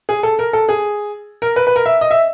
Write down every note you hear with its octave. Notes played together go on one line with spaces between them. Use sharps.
G#4
A4
A#4
A4
G#4
A#4
B4
B4
A#4
E5
D#5
E5